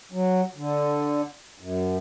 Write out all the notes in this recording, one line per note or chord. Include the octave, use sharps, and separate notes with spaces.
F#3
D3
F#2